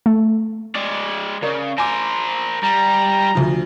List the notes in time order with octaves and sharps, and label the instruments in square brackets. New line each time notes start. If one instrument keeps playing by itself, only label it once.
[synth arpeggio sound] A3
[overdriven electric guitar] G#3 D5
[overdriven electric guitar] C#3 [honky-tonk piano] A#4 D5
[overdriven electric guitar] A#4 C5 [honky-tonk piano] G#5 D6
[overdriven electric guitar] G3 [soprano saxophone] A#5
[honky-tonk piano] D2 F3